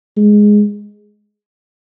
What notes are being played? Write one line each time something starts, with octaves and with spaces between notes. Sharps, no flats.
G#3